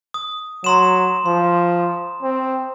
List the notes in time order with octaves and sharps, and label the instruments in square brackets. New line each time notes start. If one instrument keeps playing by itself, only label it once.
[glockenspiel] D#6
[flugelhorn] F#3 [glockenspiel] A#5 C6 E7
[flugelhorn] F3 [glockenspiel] C6
[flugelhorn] C4